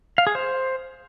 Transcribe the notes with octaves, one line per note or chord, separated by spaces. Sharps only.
F5
G#4
C5